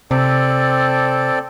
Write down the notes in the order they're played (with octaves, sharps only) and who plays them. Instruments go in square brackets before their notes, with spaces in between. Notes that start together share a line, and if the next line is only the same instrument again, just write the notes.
[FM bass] C3 [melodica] C4 A4 D5